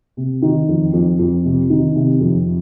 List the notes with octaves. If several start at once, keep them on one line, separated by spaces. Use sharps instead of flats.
C3
D#3
F2
F2
F2
C3
D#3
C3
F2